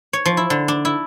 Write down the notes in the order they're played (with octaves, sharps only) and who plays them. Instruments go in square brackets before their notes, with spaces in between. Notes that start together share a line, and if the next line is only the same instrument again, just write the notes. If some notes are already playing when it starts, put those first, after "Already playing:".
[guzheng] C#5
F3
E4
D3
D4
E4